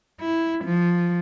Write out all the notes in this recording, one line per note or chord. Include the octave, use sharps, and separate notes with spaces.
E4
F3